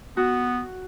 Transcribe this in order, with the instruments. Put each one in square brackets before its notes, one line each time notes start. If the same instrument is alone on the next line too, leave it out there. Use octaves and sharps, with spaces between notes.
[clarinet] B3 [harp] F#4